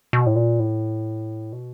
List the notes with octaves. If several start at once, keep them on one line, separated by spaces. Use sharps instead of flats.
B2
A2
A#2
A2
B2